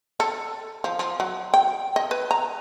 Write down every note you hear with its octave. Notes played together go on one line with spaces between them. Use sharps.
A4
F3
F3
F#3
G5
D#5
B4
A#5